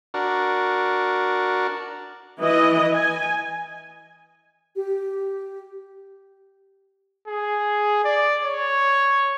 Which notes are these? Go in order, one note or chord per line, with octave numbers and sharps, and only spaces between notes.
D4 F#4 A#4
E3 D#5
G#5
G4
G#4
D5
C#5